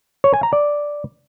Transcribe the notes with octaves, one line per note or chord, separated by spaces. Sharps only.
C#5
G#5
A#5
D5